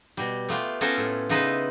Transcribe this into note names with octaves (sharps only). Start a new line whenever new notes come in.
B2 G3
A3 B3 F4 G4
B3 C#4 F4 A4 A#4 C5
A2 A4
C#3 B3 D#4 E4 B4 C5